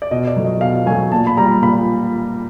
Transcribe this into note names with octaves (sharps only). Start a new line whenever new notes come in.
D5
B2 D#5
D5
F#3 A3
D#5
B2 F5
F#3 A3 G#5
A#2 A5
B5
G3 A#5
A#2 B5